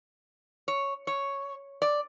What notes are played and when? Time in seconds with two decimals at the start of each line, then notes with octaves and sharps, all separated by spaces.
0.68 C#5
1.07 C#5
1.82 D5